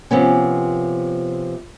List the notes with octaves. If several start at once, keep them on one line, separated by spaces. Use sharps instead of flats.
C3 F3 B3 C#4